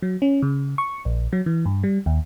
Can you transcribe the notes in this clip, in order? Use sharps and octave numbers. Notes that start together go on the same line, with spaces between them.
F#3
C#4
C#3
C#6
A#1
F#3
E3
G2
G3
D#2